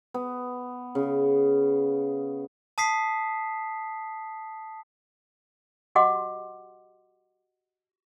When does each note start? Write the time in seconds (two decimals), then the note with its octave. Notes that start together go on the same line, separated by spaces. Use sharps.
0.14 B3
0.95 C#3
2.78 A5 D#6 B6 C7
5.95 F#4 G4 D#5 F#5 C6 D6